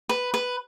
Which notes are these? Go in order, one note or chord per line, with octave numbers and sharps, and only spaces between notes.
B4
B4